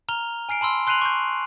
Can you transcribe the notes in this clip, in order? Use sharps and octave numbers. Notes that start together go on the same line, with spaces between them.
A#5 F6 F7 G7
G#5 F6 C7 D7
A5 B5 C6 E6
C6 F#6 C7 D#7 F7 F#7
C#6 G6